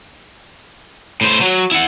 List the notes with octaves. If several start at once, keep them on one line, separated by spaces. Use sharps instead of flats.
A2 C5
F#3
E4 F#5